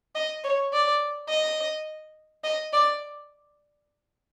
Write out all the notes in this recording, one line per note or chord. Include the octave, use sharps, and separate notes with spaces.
D#5
C#5
D5
D#5
D#5
D5